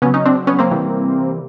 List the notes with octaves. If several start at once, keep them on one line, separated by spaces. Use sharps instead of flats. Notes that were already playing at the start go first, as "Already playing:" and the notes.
C#3 F#3 B3 C#4
C#4 D#4
C4 D4
B3 C#4
A#3 C4
C3 E3 G3